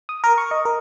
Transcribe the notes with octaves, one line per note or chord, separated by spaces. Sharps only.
D#6
A#4
C#6
D#5
A#4